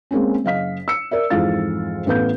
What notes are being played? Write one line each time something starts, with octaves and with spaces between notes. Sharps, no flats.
G#3 A#3 C4 C#4
F#1 D#5 F5 B6
E6 C#7
A#4 D5 E5
F2 G#2 E3 F4 F5 A6
A1 B3 A4 B4 F5 G6